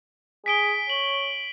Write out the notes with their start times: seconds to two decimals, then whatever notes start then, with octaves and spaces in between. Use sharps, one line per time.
0.46 G#4 B6 D7 G7
0.90 C#5 F#7